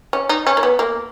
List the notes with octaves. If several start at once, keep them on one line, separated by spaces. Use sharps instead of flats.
C#4
D#4
C#4
A#3
B3
A#3